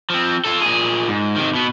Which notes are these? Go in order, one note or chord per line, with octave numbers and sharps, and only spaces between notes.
F3 C4
F4 A4
A#2 G#4
G#2
C3 D#3
B2 B3